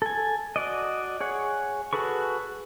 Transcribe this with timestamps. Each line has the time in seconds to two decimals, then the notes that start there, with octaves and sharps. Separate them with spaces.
0.02 A4 G#5
0.56 F#4 D5 D#5
1.20 G#4 C#5 F#5
1.93 F#4 G#4 A4 B4 C#6